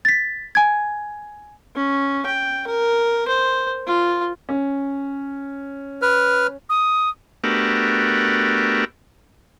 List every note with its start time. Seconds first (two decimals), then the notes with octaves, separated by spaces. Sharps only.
0.05 A6 B6
0.55 G#5 G#6
1.76 C#4
2.26 G5
2.67 A#4
3.28 C5
3.87 F4
4.49 C#4
6.02 B4 F6
6.69 D#6
7.44 A3 B3 D4 F#4 G4 A#4